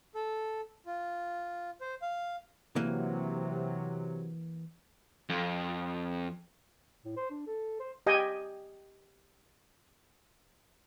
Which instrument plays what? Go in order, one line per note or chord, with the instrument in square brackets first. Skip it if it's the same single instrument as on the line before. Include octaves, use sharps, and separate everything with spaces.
[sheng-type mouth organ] A4
F4
C5
F5
[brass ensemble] C3 F#3 [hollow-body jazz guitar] E3 A#3
[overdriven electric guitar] F2
[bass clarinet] A2
C5
D4
A4
C5
[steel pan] G4 D#5 G5 G#5